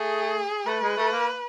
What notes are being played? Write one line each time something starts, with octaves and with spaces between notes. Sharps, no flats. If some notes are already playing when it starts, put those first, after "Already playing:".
Already playing: A3 G#4
A3 B4
G#3
A3
A#3